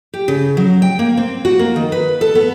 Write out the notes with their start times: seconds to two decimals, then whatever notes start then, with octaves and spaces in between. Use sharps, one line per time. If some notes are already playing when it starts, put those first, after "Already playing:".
0.14 G4
0.28 C#3
0.57 F#3
0.82 G5
0.99 A#3
1.17 C4
1.45 F#4
1.59 A#3
1.76 D#3
1.92 B4
2.21 A4
2.35 B3